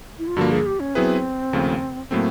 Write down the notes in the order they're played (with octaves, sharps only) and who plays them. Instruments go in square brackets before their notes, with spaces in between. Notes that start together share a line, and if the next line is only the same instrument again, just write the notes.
[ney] E4
F4
[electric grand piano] G2 D3 F3 A#3 [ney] F#4
[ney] G#4
G4
C#4
[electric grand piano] F#3 B3 E4 G#4 B4 [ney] C4
[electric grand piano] D#2 C#3 F3 A3
[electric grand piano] A2 F#3 A3 C4 [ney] A#3